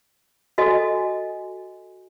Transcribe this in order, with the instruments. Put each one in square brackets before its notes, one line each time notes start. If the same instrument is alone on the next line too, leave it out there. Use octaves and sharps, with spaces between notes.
[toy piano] F#4 A4 D#5 G#5